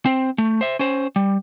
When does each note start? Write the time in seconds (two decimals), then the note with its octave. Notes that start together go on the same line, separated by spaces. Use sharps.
0.06 C4 C5
0.38 A3
0.61 C5 E5
0.79 C#4 C5
1.16 G3